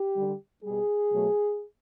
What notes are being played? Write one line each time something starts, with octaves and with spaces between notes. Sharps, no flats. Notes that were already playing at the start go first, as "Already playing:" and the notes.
Already playing: G4
D3 G3
B2 G3 G#4
B2 F#3 A3